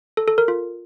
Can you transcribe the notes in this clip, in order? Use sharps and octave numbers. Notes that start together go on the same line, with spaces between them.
A4
A4
A#4
F4